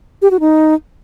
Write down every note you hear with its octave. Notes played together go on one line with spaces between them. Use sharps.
G4
F#4
D#4